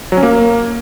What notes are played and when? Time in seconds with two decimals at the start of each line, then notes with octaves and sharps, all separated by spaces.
0.12 F#3
0.17 C#4
0.23 A#3